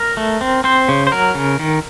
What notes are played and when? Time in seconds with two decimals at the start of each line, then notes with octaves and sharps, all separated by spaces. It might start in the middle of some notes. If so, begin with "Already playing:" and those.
Already playing: A#4
0.17 A3
0.41 C4
0.64 C4 C5
0.89 C#3
1.07 C5
1.12 F#3 A#4
1.35 C#3
1.60 D#3